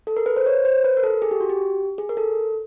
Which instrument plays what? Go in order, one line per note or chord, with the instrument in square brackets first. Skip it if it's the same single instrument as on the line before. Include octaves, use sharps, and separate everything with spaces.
[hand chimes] A4
A#4
B4
C5
C#5
C5
B4
A#4
A4
G#4
G4
F#4
G4
G#4
A#4
A4